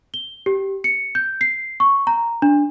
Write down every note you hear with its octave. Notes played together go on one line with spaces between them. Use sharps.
G7
G4
C#7
G6
C7
C#6
A#5
D4